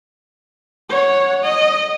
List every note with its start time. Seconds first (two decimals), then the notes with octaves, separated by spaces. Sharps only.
0.89 C#5 F#5
1.44 D#5